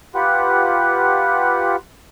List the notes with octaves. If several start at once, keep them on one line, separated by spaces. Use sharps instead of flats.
F4 G4 B4 F#5